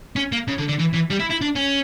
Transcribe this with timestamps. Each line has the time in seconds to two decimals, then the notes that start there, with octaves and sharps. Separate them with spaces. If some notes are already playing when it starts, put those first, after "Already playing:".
0.16 C#4
0.32 A#3
0.48 C#3
0.58 D3
0.68 D3
0.79 E3
0.94 E3
1.10 G3
1.19 E4
1.30 E4
1.41 D4
1.56 C#4